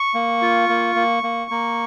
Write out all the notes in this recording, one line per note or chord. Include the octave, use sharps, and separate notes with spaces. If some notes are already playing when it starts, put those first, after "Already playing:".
Already playing: C#6
A#3
F4
A#3
A#3
A#3
A#3